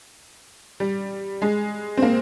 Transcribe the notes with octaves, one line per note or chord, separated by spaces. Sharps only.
G3
G#3
C4
A#3